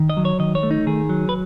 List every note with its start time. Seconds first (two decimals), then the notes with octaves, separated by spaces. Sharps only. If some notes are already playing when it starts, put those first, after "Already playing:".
Already playing: D#3
0.10 D#5
0.17 F#3
0.25 C#5
0.39 D#3 D#5
0.55 C#5
0.63 A3
0.71 D#4
0.86 D#3 G#4
1.09 F#3
1.29 B4